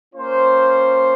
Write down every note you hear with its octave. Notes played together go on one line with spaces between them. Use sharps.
A#3 C#4 F4 C5